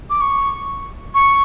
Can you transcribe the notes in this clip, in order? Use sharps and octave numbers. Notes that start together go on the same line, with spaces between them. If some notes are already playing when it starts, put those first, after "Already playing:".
D6
C#6
C#6